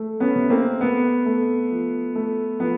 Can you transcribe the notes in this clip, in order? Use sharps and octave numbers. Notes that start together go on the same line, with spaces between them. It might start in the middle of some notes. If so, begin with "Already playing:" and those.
Already playing: A3
B3 C#4
C3
A#3 C4
A3 B3
A3
F3
A3
F3 B3